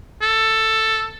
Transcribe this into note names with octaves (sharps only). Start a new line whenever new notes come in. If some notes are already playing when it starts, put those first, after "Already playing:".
A4